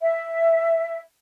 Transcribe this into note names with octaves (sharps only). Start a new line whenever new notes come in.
E5